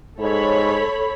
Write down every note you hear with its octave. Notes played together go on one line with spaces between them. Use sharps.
G#2 A4 C#5 B5